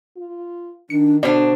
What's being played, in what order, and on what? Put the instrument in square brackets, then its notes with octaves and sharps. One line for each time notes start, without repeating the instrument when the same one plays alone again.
[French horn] F4
[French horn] D#3 [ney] D4 [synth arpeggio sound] C#7
[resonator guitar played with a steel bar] B2 D4 [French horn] D3 [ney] C5 [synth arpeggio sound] D5